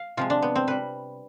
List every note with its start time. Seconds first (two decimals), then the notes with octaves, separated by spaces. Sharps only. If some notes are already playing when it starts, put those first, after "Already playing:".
Already playing: F5
0.17 C3 F3 G#3 F4
0.30 D4
0.42 B3
0.56 C4
0.67 C3 G3 B4